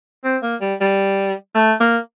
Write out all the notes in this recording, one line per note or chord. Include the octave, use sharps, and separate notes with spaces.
C4
A#3
G3
G3
A3
A#3